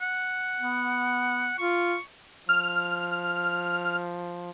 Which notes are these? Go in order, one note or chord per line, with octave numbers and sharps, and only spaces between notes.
F#5
B3
F4 C#6
F3 F6